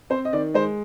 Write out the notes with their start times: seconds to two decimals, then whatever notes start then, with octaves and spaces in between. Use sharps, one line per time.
0.10 C4 C5
0.25 D#5
0.33 D#3 D5
0.54 G#3 C5